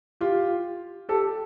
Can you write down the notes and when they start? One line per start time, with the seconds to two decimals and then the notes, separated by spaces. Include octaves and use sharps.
0.21 F4 G4
1.09 G4 A4